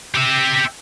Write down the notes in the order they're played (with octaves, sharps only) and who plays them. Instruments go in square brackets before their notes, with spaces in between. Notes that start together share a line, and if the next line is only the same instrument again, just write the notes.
[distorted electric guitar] G4 E5